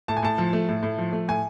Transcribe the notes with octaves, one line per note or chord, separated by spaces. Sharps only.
A2 A5
G#5
A2 A5
F3
A3
A2
A2
F3
A3
A2 G#5